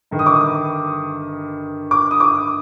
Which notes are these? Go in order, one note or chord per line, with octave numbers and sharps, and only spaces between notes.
G1 G2 D#3
D#6
D6
D#6
D6
D#6
D6